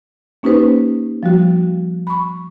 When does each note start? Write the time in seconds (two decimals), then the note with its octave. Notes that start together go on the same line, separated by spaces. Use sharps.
0.43 A#3 C#4 D#4 G4 B4 C5
1.23 F3 G3 F#4
2.07 B5 C#6